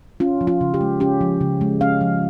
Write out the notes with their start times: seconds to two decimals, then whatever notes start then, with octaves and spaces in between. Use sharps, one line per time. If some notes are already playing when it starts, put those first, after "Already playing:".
0.20 C#4 F4
0.41 F3
0.47 F4
0.61 C#3
0.74 G4
0.81 G#3
1.00 C#4 G4
1.21 F3
1.41 C#3
1.61 G#3
1.81 C#4 F5
2.01 F3